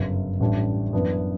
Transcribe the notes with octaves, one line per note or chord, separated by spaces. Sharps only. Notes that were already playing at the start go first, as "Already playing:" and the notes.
Already playing: G1 F#2 C#3
A1 A2 G3 D4
F#2 E3 B3 D4